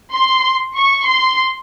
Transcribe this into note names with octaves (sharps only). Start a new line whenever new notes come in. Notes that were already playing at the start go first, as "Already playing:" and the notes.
C6
C#6
C6